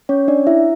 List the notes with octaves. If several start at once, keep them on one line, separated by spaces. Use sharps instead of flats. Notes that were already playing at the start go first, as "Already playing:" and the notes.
C#4 C#5
D4 D5
E4 E5